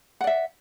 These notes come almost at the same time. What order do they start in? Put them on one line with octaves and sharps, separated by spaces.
F#5 D5 E5